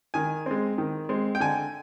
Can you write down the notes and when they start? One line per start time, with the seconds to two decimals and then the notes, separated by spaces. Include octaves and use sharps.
0.14 D#3 G#5
0.46 G#3 C4
0.78 D#3
1.09 G#3 C4
1.35 G5
1.40 D3 G#5